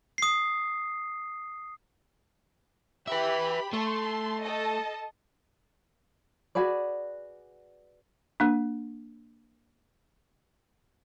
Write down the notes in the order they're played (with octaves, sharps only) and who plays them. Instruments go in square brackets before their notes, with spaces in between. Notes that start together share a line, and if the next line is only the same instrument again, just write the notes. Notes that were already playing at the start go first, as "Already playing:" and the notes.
[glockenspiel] D#6 C7
[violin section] G4 B5 [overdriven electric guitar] B4 E5
[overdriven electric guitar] A3 [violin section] A5 C6
[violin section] A4 D#5 A5
[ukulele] F#4 G#4 B4 D5
[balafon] A#3 D4